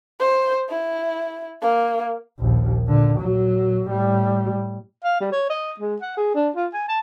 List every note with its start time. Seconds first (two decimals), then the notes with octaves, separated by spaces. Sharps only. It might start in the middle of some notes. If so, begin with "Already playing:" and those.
0.20 C5
0.70 E4
1.62 A#3
2.39 A#1 D#2
2.87 A#2 D3
3.20 A#2 F#3
3.87 A2 G3
5.04 F5
5.20 G3
5.32 C#5
5.50 D#5
5.80 G#3
6.01 F#5
6.17 G#4
6.34 D4
6.56 F4
6.73 G#5
6.88 A5